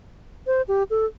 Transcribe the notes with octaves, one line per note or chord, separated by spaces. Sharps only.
C5
G4
A4